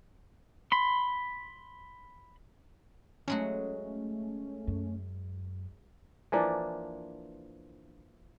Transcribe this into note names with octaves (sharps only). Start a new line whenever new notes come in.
B5 C6
F#3 G#3 A3 C#4 F#4
F#2
E3 F3 A#3 D4